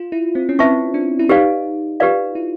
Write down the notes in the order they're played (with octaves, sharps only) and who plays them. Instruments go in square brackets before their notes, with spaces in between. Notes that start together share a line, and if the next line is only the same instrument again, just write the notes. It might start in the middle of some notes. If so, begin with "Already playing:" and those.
Already playing: [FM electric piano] F4
E4
C4
C#4
[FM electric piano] C4 [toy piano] B4 E5 A5 C#6
[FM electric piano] D4
E4
[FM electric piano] D#4 [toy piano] G4 B4 D5 F5
[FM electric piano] F4 [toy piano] G4 B4 D5 F5
[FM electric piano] E4